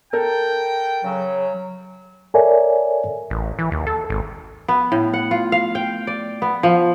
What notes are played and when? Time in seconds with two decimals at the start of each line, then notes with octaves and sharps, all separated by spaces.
0.13 A4 A#4 G5
1.04 C#3 F#3
2.34 A4 A#4 C#5 D5 E5 G#5
3.30 A1
3.59 E3
3.72 D#2
3.87 A4
4.10 G#1
4.68 B3
4.92 A2
5.14 F#5
5.31 F4
5.52 F5
5.75 G5
6.07 D5
6.42 B3
6.63 F3